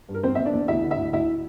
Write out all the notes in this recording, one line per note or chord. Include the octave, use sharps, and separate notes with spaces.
G2
A#4
E2 C4 C5
E2 E5
D4 D5
E2
D2 E4 E5
D3
E4 E5
D2
D2 E4 E5